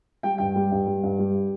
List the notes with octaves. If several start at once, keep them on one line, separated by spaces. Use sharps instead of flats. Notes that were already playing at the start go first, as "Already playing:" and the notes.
G3 G5
G2 G5
G3
G2
G3
G2
G3